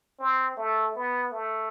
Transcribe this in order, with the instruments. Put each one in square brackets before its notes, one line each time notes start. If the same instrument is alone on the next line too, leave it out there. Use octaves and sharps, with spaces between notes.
[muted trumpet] C4
A3
B3
A3